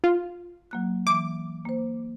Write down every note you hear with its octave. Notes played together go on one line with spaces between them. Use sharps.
F4
F#3 A#3 F#6
E3 D6
A#3 C5